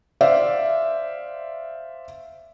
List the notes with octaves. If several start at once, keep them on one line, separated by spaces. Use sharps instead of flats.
C5 D5 E5 F5